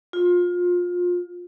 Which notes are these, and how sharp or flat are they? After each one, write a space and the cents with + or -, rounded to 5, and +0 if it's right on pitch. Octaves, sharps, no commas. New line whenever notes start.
F4 +25